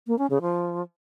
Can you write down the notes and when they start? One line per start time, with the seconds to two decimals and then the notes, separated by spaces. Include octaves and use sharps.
0.07 A#3
0.18 C#4
0.30 C#3
0.42 F3